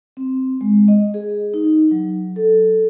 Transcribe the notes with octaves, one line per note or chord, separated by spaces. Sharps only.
C4
G#3
D#5
G#4
D#4
F#3
A4